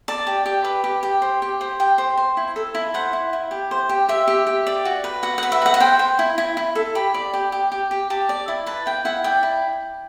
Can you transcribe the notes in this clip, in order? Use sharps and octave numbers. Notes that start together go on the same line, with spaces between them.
D5 A5
G4
G4
B4
G4
G4
C5
G4
C5
G4 G5
C5
C5
E4
A4
E4
C5 F#5
E4
E4
G4
C5
G4
G4 E5
G4
G4
D5
F#4
B4
F#4 F#5
B4 F#5
E5
F#4 F#5
F#5
C5 G5
C5
E4
E4
E4
A4
G4 B5
D5
G4
G4
G4
G4
G4 A5
D5
E4
B4 A5
E4 G5
E4 F#5
D5 G5
E4